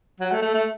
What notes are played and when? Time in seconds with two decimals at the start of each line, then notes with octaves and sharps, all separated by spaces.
0.20 F#3
0.32 A3
0.42 A3
0.54 A3